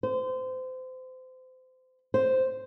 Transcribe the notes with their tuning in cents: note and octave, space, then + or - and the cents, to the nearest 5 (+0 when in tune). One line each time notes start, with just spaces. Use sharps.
C5 -30
C5 -5